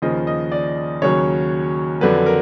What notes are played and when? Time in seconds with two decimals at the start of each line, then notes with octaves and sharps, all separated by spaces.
0.02 D#2 C#3 F3 D#5
0.27 D#5
0.52 D5
1.02 D#2 C#3 F#3 C#5
2.01 F2 D3 F#3 B4
2.26 A#4